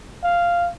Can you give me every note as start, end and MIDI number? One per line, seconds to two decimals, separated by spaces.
0.24 0.70 77